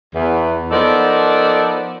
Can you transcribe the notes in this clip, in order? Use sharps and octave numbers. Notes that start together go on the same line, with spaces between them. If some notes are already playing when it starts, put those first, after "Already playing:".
E2
F3 B3 D#4 A4 A#4 D5